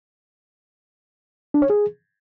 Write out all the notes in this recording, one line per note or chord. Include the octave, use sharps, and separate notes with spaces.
D4
C#5
G#4